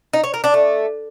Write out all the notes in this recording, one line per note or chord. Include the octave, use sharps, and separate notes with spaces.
D#4
C#5
A#4
D4
A3